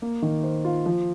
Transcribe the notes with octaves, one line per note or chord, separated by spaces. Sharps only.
A#3
D#3
C5
F4
F3